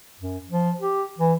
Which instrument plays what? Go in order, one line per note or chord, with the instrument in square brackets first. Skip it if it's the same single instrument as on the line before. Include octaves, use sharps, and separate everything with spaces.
[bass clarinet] F#2
F3
G4
E3